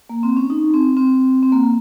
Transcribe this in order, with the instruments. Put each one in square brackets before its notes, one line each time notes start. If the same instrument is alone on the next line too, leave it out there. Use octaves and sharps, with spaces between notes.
[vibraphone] A#3
C4
C#4
D#4
C4
C4
C4
A#3